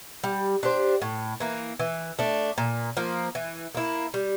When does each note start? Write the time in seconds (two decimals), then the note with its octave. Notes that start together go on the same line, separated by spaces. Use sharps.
0.24 G3
0.63 D4 G4 C5
1.02 A2
1.40 E3 A#3
1.79 E3
2.19 A3 D4
2.58 A#2
2.97 F3 A#3
3.35 E3
3.75 A#3 E4
4.14 G3